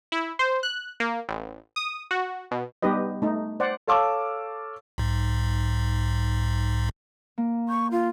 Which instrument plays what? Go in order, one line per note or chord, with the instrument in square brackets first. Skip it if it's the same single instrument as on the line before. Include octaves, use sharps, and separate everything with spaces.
[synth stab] E4
C5
F#6
A#3
A1
D#6
F#4
B2
[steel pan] G3 B3 D#4 G4 B4 D#5
A3 D#4
C5 D5 F#5
[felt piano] A4 C#5 F5 A5 D6 E6
[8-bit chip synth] B1 G#2
[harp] A#3
[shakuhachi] C#6 [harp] G6
[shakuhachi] F4